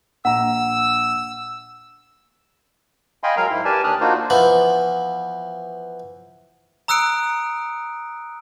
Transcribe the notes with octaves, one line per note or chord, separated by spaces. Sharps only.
A#1 F#5 A#5 E6
D#5 F5 G5 G#5 B5 C6
F#3 G#3 A#4 F5 A#5
G#2 E4
G4 A#4 B4 D5 G#5 A5
D#2 D4 D#6 F6 F#6
A#3 D4 D#4 F4 F#4 C5
E3 F3 B3
A#5 D#6 E6 F#6 C#7 D7